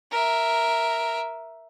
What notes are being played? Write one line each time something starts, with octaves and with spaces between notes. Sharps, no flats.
A#4 E5